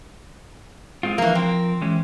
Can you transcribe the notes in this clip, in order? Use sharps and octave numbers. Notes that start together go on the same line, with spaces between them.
G#3 C4 F4
E3 F3 A#3 A#4
C4
E3 G#3 C#4